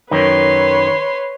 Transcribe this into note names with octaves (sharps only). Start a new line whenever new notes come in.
F#2 D#3 B4 C#5 C6